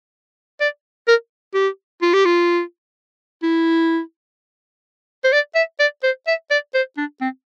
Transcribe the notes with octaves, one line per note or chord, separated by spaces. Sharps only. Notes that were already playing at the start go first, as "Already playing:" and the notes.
D5
A#4
G4
F4
G4
F4
E4
C5
D5
E5
D5
C5
E5
D5
C5
D4
C4